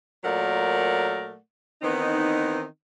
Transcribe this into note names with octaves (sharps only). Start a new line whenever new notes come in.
A#2 F#3 A3 A#4 D5 F#5
D#3 E3 B3 C4 D#4